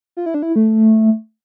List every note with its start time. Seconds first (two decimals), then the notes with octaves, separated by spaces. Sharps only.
0.17 F4
0.26 E4
0.34 D4
0.43 E4
0.56 A3